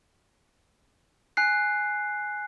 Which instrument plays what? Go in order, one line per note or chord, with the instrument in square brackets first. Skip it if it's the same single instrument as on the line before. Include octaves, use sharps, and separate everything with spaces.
[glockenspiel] G#5 F#6 C7